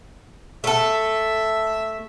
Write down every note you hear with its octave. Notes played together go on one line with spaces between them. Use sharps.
A3 A4 E5